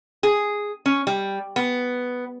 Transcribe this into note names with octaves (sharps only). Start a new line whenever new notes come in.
G#4
C#4
G3
B3